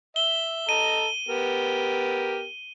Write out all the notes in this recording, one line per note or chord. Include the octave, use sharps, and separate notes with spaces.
E5 G7
A4 D#5 A#5 D#7
B3 G4 A#4